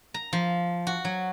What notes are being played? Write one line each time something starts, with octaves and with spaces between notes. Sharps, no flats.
A#5
F3
F#4
F#3